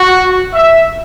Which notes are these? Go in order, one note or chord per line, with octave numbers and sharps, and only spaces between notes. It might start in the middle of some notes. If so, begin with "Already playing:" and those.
Already playing: F#4
E5